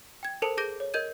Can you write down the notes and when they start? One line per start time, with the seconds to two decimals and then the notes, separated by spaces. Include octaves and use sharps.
0.23 G5 G#6
0.42 A4 A#4 C5 A5 C#7 F7
0.57 G#4 D6 G6 A#6 D7 G7
0.80 C#5
0.94 A#4 D#5 G6 G#6 D#7